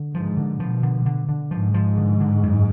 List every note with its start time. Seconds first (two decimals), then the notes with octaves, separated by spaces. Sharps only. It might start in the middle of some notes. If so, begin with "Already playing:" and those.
Already playing: D3
0.14 G#2 F3
0.37 D3
0.60 B2 F3
0.83 D3
1.06 D3
1.29 D3
1.51 G#2 F3
1.74 F3
1.97 D3
2.20 D3
2.43 F#2